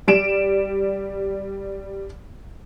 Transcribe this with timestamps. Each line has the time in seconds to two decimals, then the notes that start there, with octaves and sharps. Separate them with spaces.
0.08 G3 D7 E7